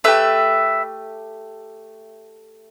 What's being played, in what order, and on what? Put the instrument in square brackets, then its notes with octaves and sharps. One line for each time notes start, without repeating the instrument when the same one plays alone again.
[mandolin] A3 G4 B4 E5